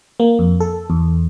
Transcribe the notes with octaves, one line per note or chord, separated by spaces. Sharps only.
A#3
F2
A4
E2